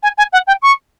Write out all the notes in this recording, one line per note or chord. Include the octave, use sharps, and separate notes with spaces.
G#5
G#5
F#5
G5
C#6